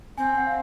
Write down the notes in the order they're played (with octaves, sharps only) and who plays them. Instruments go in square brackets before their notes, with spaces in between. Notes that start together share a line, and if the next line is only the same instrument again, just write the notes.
[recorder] C4 [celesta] G#5
[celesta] G#5
F#5
F5